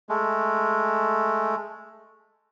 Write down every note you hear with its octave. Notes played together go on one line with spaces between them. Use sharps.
G#3 A3